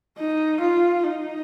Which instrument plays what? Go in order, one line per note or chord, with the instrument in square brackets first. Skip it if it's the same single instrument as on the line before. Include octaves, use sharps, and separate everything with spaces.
[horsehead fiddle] D#4
F4
D#4